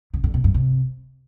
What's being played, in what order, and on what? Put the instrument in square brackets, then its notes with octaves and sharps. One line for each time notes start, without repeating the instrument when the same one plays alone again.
[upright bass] C#3
D3
B2
G2
C3